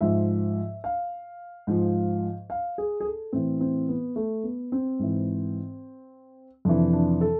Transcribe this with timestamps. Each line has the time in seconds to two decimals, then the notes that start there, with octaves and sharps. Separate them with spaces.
0.01 G#2 F3 E5
0.84 F5
1.67 G#2 F3
2.50 F5
2.78 G#4
3.00 G#4
3.05 A4
3.33 A2 E3 C4
3.60 C4
3.89 B3
4.16 A3
4.44 B3
4.72 C4
4.99 G#2 E3
6.65 F2 C3 E3 D4
6.93 D4
7.21 A4